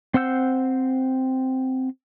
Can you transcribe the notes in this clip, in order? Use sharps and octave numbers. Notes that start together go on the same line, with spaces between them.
C4 C5 F#5 E6 G6